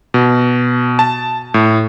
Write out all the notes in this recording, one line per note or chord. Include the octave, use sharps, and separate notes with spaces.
B2
A5
A2